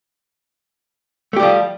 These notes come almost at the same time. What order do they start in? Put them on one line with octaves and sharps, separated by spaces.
A3 G4 G3 F3